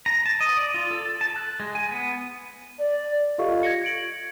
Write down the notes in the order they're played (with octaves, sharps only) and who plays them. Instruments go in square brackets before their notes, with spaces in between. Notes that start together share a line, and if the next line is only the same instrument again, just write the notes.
[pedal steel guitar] A#5
A5
D#5
D5
F4
A4
A5
F#6
G#3
G#5
B3
[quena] D5
[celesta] F4 G4 A4 D#5 F5 C#6
G#6 A#6 C#7
G#6 C#7 D7 F#7